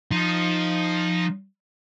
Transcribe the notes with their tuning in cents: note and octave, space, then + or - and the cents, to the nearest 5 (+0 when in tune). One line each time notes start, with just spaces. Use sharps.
F3 +5 D#4 +0